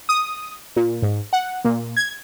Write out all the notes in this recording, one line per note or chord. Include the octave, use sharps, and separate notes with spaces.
D#6
A#2
G#2
F#5
A#2
G#6